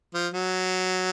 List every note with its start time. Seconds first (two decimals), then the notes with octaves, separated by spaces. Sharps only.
0.14 F3
0.34 F#3